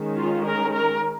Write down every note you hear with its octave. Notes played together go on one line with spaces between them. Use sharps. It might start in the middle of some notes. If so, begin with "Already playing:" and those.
Already playing: D#3 G#3 C#4
F4
A#4
A#4